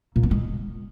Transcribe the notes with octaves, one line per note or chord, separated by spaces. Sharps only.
A#2
B3
G#3